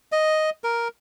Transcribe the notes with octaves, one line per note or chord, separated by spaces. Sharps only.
D#5
A#4